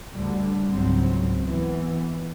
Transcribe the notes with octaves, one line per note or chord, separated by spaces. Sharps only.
D2 D3 G3
C#2 G#2 F#3 C4
E3 B3